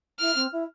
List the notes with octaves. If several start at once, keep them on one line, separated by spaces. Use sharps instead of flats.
E4 F6
C4
E4